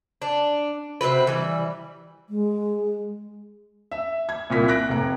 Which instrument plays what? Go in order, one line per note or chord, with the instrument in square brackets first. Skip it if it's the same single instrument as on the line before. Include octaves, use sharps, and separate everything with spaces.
[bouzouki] D4
C3 C4 F#4 B4
E3 G3
[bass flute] G#3
[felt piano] E5
G#6
C2 A#2 B6
F#6 A#6 D7
F1 A#5